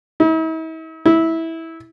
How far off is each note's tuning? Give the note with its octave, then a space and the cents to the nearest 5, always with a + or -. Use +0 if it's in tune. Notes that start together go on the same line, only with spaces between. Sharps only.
E4 -45
E4 -15